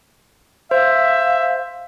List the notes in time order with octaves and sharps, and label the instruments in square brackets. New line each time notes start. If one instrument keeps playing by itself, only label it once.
[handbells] C5 [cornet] E5 [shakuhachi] F5